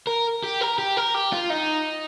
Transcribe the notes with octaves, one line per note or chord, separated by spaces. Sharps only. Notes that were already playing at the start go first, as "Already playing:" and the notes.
A#4
G4
A#4
G4
A#4
G4
F4
D#4